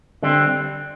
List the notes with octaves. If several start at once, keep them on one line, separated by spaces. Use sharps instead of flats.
D3 G3 C4